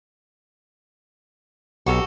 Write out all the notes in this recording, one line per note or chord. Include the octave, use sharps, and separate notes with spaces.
B1 F#4 G4 A4